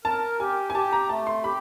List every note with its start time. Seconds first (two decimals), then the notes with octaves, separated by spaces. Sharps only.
0.05 A#4 A5
0.39 G4 G#5
0.70 G#5
0.75 G4 A5
0.92 A#5
1.09 A3 A5
1.27 C6
1.44 G4 B5